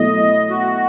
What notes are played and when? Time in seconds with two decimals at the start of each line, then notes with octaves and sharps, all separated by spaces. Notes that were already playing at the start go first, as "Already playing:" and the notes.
Already playing: B2 F#3 A3 E4 D#5
0.50 F#4